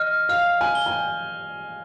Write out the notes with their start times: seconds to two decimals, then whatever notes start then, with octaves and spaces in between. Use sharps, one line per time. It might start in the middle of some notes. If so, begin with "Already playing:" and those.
Already playing: D#5 F6
0.29 F5 F6
0.61 G#5
0.75 G7
0.86 G#5
0.91 G5